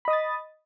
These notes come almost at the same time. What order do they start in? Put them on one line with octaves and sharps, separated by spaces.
B5 D#5 D#6 A6